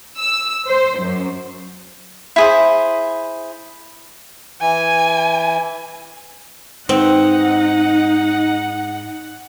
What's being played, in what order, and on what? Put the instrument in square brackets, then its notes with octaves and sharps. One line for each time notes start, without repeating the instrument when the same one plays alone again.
[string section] E6
C5
F#2
[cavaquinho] E4 G#4 C5
[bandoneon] E3 [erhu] G#5
[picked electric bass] G#2 [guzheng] C4 [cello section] D#4 [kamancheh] F#5